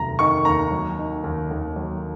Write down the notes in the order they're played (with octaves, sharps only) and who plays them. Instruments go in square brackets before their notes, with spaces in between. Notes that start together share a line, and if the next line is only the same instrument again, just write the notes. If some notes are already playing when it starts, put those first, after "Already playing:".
Already playing: [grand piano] F1 D#2 F#3 A#5
D#3 C#6
D#2 A#5
F#3
D#3
D#2
D#2
F#3